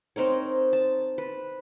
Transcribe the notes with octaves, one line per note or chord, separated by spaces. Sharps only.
C4 D#4 A#4 C#5
A5
B4